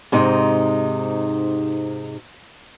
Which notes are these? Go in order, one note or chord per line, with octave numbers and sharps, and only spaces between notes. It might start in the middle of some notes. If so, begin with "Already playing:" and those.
G#2 C3 D#4